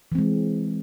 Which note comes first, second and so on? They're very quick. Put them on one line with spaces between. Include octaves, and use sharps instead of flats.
E3 C4 G#3